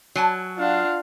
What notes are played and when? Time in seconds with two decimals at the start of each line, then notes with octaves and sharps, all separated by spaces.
0.15 F#3 G#5 A5
0.58 D4 F4 F5 F#5